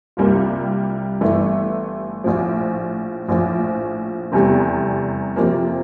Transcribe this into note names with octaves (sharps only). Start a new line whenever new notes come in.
C2 C3 G3 A#3 F4
G1 G2 E3 A3 E4
A#1 A2 F3
A#1 A2 F3
F1 E2 C3 G3
F2 C3 F3 A#3